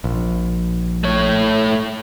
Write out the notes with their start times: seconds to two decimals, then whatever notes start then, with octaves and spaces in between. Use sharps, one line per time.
0.04 A#1
1.04 A3 C#5